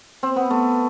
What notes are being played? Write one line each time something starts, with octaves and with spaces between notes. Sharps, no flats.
C4
B3
A3